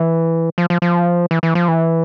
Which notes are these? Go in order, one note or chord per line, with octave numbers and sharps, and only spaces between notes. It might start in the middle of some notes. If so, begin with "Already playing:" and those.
Already playing: E3
F3
F3
F3
E3
E3
F3
E3